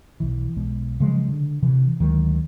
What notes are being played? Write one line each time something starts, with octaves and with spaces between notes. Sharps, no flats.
B1 E3
B1 B2 G#3
C#3 F3 F#3 G#3
D3
C3 E3
D2 D#3 F#3 G#3